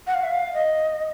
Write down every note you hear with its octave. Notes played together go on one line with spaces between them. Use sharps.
F#5
F5
E5
F5
D#5